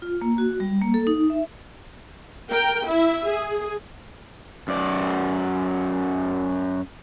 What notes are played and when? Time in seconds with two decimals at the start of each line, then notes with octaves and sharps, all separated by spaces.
0.02 F4
0.22 A#3
0.38 F#4
0.60 G3
0.82 A#3
0.94 A4
1.07 D#4
1.30 E5
2.50 A#4 G5
2.87 E4 E5
3.25 G#4
4.68 F#2 D5